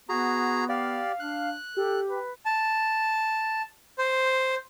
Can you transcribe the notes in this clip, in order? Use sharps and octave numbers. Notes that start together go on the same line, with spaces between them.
B3 F#4 G#4 A#5
G4 D5 F5
D4 F#6
G4 A4
B4
A5
C5